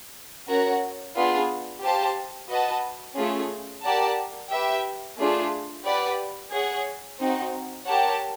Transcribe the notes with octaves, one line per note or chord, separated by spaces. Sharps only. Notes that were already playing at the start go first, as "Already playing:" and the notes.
C#4 F#4 A#4 C#5 F#5
B3 D4 F4 G#4
G4 C5 F5 A5
F#4 B4 D#5 F#5 A5
A3 C#4 F4 G#4
G4 A#4 D5 F#5 A5
G4 B4 E5 G5
A3 D4 F4 G#4
G4 B4 D5 F#5
G#4 C#5 F#5
C4 D#4 F#4
G4 A#4 C#5 F#5 A5